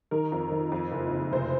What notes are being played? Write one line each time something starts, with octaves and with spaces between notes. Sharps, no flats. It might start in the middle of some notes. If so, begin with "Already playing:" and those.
D#3 A#4
F2
D#3
F2
F#1
F#1
F1 C5